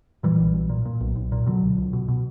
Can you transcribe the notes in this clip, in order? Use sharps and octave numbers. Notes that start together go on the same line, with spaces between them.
A#2 E3 G3
B1
B1
A#2
A#2
B1
B1
A#2
B2 D3 F#3
C#2
C#2
B2
B2